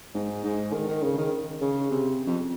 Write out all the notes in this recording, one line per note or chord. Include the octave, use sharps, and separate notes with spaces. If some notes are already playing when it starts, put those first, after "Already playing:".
G#2
G#2
D#3
D#3
C#3
D#3
C#3
C3
F2